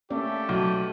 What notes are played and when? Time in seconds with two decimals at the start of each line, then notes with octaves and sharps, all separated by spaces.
0.10 A3 A#3 C#4 G4 D5
0.49 B1 B3